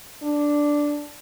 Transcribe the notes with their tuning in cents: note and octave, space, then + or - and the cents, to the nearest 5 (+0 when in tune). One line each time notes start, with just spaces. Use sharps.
D4 -5